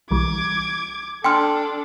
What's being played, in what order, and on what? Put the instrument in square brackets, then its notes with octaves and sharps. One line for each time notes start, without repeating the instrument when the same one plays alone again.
[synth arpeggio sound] B1 E3 G3 [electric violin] D6 G#6
[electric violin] D4 A4 [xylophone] G5 C6 F6